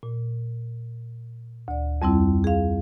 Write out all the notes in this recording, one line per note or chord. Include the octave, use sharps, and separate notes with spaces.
A#2
D2 D5
F2 G3 C4 E4
G#4 F5